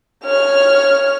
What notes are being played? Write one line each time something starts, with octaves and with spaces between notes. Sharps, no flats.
C#5 F6